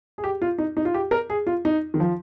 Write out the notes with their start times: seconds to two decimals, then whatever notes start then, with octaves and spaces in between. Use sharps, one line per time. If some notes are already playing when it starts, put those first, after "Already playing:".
0.18 G#4
0.24 G4
0.42 F4
0.58 D#4
0.77 D#4
0.85 F4
0.94 G4
1.11 A#4
1.30 G#4
1.47 F4
1.65 D#4
1.94 D#3
2.00 F3